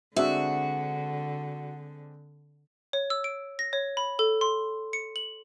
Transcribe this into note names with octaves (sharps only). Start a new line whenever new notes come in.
D3 G#3 C4 D4 F#4 E5
C#5
E6
D7
A#6
C#5
B5
A4
C6
C#7
F#7